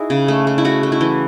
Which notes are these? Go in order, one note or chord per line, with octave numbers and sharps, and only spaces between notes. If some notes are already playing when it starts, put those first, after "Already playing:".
Already playing: D#4 E4 F#4 G#4
C#3
A3
A3
E4
A3 F#4
A3
E4
E3